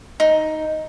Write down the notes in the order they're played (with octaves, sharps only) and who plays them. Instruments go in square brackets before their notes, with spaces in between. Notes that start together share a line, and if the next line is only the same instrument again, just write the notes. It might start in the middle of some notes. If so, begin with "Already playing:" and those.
[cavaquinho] D#4